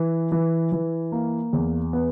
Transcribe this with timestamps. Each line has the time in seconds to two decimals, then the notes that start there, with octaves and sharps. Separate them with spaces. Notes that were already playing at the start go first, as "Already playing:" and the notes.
Already playing: E3
0.32 E3
0.72 E3
1.12 A#3
1.53 E2
1.93 B3